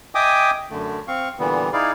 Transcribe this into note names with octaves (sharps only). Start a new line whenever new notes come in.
D#5 E5 G5 G#5 D6 D#6
F#2 D3 A3
C4 F5 C#6
A#2 D3 E3 G3 B3
D#4 E4 G#4 D5 F5